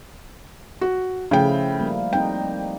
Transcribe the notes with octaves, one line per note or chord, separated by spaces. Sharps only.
F#4
C#3 F3 A3 E4 G5
G3 A#3
G3 C4 D#4 G5